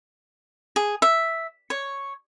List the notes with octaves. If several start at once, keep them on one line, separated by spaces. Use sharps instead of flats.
G#4
E5
C#5